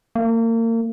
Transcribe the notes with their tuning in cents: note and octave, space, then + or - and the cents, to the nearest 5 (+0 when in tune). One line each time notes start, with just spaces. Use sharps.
A#3 -35